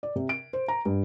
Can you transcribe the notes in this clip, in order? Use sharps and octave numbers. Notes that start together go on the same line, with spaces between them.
D5
C3
D7
C5
A#5
G2